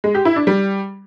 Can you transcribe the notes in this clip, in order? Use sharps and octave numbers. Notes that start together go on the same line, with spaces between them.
G#3
G4
E4
D4
G3